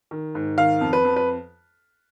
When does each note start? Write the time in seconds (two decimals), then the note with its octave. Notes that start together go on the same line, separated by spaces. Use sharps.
0.11 D#3
0.35 G#2
0.57 D#3 F5
0.81 F2
0.93 B4
1.05 F2
1.16 B4